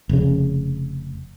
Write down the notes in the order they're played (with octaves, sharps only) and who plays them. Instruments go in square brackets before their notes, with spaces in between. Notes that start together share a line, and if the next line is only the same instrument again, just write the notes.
[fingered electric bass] F1 C#3